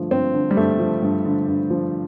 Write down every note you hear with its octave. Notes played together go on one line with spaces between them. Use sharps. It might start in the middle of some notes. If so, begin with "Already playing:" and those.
Already playing: G2 D3 F3 A3
G2 C4
D3
G3
G2 A3
F3
G2
D3
G2
F3